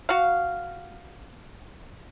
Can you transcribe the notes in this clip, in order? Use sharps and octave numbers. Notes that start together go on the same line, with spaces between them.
F#4 F5